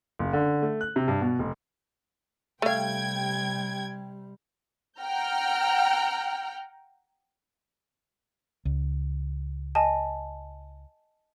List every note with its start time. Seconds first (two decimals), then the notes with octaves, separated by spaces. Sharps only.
0.19 F#1
0.33 D3
0.62 A3
0.81 F#6
0.96 C3
1.08 G2
1.21 B2
1.39 F1
2.62 C3 G3 A3 F5 G5 G#6
4.99 F#5 G5 A#5 F6 G6
8.65 C#2
9.75 D#5 G#5 A5